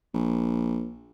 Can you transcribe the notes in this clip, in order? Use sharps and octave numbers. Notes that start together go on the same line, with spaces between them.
A#1